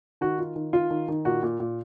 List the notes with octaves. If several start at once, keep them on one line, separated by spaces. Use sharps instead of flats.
D#3 F#4
F4
D#3
F4
D#3
D#3
A#2 F#4
A#2
A#2